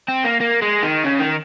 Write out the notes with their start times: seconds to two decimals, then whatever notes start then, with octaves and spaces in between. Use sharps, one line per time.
0.08 C4
0.25 A#3
0.41 A#3
0.62 G#3
0.83 D#3
1.04 C#3
1.20 D#3